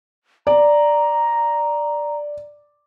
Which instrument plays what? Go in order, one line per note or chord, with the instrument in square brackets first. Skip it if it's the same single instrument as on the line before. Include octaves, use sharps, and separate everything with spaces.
[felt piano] D5 [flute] A#5